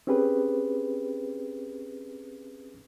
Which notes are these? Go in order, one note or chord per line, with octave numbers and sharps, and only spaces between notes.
C4 C#4 G4 G#4 B4